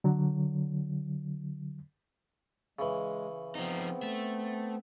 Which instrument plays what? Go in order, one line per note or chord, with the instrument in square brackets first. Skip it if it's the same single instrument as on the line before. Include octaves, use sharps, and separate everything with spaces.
[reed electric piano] D3 F#3
[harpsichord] C#3 E3 [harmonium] G#3
[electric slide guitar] F3 D#4 [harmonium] B3 C4
[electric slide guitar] A3